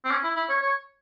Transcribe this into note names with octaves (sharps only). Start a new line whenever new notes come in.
C4
C#4
E4
E4
C#5
C#5